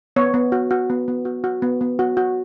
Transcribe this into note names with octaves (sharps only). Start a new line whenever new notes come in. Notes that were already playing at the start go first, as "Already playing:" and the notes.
B3 C#5
B3
F#4
F#4
B3
B3
F#4
F#4
B3
B3
F#4
F#4